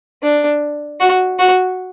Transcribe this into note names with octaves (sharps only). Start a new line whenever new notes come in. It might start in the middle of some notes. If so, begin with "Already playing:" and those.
D4
F#4
F#4